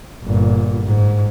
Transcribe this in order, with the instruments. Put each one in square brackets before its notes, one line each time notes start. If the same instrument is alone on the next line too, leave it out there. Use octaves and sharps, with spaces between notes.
[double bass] G1 A#2
G#2